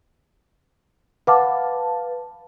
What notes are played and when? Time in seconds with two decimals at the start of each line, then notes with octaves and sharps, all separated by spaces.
1.27 B4 F5 F#5 A5 D6